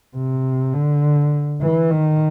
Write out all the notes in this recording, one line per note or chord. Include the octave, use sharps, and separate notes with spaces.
C3
D3
E3
D#3